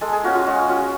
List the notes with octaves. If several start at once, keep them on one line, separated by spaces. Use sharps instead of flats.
G#3 A4
G#4
C#4 F4 F#4
F4
G#3 F#4
C#4 F4 F#4